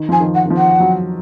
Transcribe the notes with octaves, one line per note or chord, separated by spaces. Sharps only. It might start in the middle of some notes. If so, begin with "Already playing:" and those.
Already playing: D#3
F3 G#5
D#3
F#5
D#3
F3
F#5
F#3